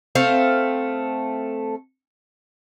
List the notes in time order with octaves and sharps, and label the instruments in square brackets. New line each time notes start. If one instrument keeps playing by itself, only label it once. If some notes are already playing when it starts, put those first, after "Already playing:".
[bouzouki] A3 C4 F5